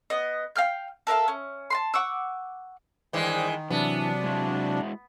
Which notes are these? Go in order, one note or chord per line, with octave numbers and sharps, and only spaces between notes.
B3 D#5
F5 G5 F6 G6
A4 A#4 E5 F5
C#4
A5 B5 C6
F#5 C#6 D6 E6
G2 D#3 E3 G#3 C5 D5 G5
C3 E3 F#3 B3 D4
G#3 E4 F#4